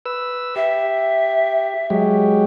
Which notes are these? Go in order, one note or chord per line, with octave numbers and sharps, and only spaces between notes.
B4 E6
G4 E5
F#3 G#3 G4